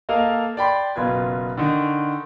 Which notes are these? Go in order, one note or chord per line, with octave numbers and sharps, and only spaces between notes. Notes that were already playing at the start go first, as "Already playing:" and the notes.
A#3 A4 A#4 D#5 F5
D5 G5 B5 C6
F#1 B2 F4 B4 G#6
D3 D#3